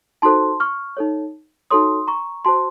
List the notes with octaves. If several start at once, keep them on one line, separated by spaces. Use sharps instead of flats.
D#4 F#4 A4 C5 A5 C6
C#6 F6
D#4 A4 C#5
D#4 F#4 A4 C#5 C6 D#6
A#5 C#6
F#4 C5 A5 C6